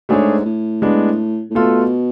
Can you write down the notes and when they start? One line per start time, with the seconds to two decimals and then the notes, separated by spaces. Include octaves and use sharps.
0.09 G#2 A3 D4 G#4 C#5
0.45 A2
0.82 G#3 B3 D4
1.50 A2
1.55 B2 A3 F4 A4